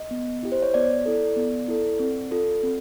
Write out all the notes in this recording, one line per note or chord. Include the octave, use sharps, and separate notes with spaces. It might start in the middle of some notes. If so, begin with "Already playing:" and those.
Already playing: D#5
B3
E4 G4
C5
C#5
B3 D5
E4 A4
B3
E4 A4
C4
F4 A4
C4